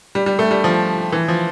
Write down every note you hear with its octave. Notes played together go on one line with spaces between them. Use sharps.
G3
G3
A3
G3
F3
E3
F3